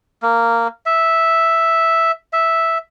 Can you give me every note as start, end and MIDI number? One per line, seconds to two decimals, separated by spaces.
0.22 0.68 58
0.86 2.11 76
2.33 2.78 76